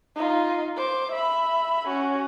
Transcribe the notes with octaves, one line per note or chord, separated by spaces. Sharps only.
D#4 F4
C5 D6
E5 B5
C#4 F#4